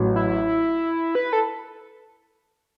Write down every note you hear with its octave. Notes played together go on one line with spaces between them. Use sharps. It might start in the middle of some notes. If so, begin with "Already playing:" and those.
Already playing: A1 A2 F#3
E4
B4
A4